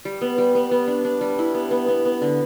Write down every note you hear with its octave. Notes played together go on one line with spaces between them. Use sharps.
G3
B3
G3
B3
B3
D4
D4
G3
E4
B3
B3
B3
B3
D3